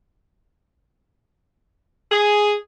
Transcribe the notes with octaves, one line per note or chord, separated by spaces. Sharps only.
G#4